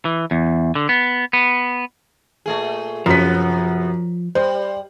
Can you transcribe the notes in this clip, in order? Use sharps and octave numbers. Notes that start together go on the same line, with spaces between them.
E3
E2
D3
B3
B3
A#2 A3 G#4
F#2 C3 F3 B3 B6
G3 C5